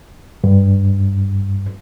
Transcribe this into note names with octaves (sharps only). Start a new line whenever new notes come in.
G2